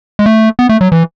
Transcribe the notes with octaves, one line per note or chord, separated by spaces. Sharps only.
G#3
A3
B3
A3
F#3
E3